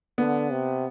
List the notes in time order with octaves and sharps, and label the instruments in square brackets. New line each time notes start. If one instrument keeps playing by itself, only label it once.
[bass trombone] D3 [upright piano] B3
[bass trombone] C3